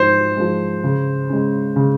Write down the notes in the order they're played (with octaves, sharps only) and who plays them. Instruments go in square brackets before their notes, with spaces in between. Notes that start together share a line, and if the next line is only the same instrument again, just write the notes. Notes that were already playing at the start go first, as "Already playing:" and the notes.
Already playing: [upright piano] G#2 F3 G#3 [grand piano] C5
[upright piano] F3 G#3
C#3
G#3 C#4
C#3